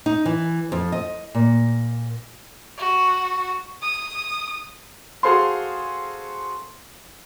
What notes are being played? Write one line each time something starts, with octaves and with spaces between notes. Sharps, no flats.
D#4
E3
F2
D#5
A#2
F#4
D#6
F#4 G#4 A4 C5 F5 C6